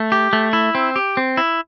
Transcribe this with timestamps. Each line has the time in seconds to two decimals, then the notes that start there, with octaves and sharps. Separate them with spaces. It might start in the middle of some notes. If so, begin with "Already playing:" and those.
Already playing: A3
0.12 G4
0.33 A3
0.53 E4
0.75 C4
0.96 G4
1.17 C4
1.37 E4